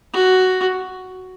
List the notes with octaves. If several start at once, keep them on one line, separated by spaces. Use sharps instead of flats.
F#4